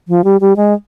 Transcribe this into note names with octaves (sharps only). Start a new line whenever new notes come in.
F3
G3
G3
G#3